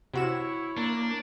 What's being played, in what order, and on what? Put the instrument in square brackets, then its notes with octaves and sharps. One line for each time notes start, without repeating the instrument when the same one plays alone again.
[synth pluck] C3 F#4 E7 [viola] E4 C#5
[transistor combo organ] A#3 [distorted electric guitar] D4